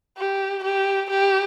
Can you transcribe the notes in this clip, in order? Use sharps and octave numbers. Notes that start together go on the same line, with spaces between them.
G4
G4
G4